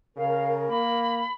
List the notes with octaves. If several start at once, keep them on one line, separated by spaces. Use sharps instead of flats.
C#3 A#4 F5
A#3 B5